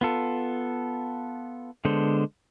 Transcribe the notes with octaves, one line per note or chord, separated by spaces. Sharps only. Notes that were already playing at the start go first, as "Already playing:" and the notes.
B3 F4 A4
D3 G#3 B3 A4 C5